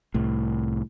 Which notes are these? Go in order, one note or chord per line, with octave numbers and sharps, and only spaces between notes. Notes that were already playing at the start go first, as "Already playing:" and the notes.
C2 A2